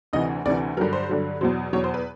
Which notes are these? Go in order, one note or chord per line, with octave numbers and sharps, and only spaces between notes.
D2 C3 E3 D#5
D2 C3 E3 D5
G2 D3 F#3 A#4
C5
G2 D3 F#3
E2 B2 F#3 C5
E2 B2 F#3 C#5
C5
B4